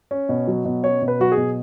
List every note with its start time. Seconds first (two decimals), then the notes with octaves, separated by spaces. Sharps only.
0.11 C#4
0.29 B2
0.48 F#3
0.65 B2
0.84 C#4 C#5
1.02 B2
1.08 B4
1.20 F#3 F#4
1.32 G#4
1.37 B2